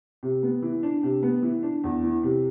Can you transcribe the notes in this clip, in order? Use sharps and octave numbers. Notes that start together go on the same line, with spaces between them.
C3
B3
E3
D4
C3
B3
E3
D4
E2
E3
C3